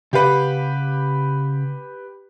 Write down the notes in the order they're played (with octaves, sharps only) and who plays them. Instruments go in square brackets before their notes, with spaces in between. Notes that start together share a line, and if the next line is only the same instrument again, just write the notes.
[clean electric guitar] C#3 F5 F#5 [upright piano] G4 B4